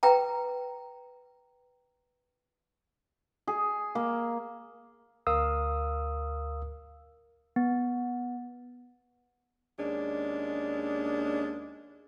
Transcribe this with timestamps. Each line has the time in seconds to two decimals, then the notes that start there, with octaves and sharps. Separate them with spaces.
0.03 B4 G5 A#5
3.47 G#4
3.95 A#3
5.27 D2 A#4 F5 D#6 E6
7.56 B3
9.78 D#2 G#3 C#4 D4